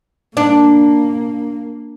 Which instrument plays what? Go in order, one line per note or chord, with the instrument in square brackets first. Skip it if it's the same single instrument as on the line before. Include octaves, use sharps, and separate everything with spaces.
[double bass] A#3 [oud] D4